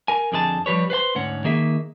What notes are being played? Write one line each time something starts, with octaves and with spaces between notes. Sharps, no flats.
A#4 G#5
F2 D3 G#4 B4 A5
F3 G3 B4 C#5
B4 C5 F#5 C6
D2 G#2 C#4 F#5
D#3 A#3 G#4 E5